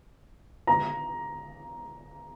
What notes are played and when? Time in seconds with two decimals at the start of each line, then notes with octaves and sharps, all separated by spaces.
0.67 A#5